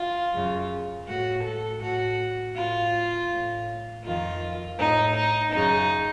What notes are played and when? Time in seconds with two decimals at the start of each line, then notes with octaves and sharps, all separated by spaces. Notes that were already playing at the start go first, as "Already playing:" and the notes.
Already playing: F4
0.33 F#2 C#3
1.07 A2 F#4
1.45 A4
1.82 A2 F#4
2.56 A2 F4
3.31 A2
4.04 F2 D#3 F4
4.79 A2 D#4
5.16 D#4
5.53 F#2 C#3 D#4